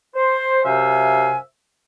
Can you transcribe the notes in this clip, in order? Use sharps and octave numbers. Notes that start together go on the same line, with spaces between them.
C5
F#2 C3 C5 E5 F5 G#5